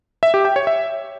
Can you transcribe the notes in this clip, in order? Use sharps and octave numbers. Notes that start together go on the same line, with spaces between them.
E5
G4
G5
C#5
E5